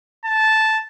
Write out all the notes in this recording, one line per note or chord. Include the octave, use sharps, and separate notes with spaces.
A5